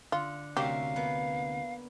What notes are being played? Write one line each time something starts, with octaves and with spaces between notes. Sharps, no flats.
D3 F4
D2 C3 C#4 G4 A#4 E5 F5
A#3 B3